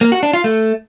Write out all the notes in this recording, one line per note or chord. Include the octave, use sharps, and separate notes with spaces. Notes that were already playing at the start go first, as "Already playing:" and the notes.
A#3
F#4
D4
F4
A3